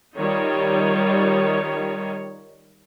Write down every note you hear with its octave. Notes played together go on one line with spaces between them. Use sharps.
D#3 G3 D#4 F4 C#5